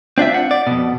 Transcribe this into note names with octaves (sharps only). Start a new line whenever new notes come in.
C4 D4 F4 E5
F#5
D5
F2 B2